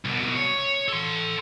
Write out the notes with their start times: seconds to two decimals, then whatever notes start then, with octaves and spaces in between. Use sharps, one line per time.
0.05 C2 B2
0.36 C#5
0.88 A4 C6